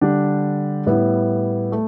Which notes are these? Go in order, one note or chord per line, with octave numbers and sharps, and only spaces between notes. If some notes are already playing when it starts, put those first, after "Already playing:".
D3 G3 D4 G4
A2 G3 B3 E4
A3